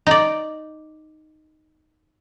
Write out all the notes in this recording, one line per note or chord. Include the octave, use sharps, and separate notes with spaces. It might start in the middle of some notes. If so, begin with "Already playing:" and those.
D#4 D5